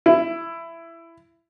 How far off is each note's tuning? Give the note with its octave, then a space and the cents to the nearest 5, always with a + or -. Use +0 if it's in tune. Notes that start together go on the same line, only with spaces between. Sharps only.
E4 +15